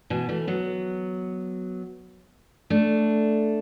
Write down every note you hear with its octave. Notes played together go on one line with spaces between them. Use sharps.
B2 E3
E3 A3
F#3 B3
A3 D4